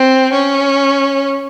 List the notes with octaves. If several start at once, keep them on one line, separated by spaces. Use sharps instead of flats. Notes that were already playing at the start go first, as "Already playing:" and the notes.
Already playing: C4
C#4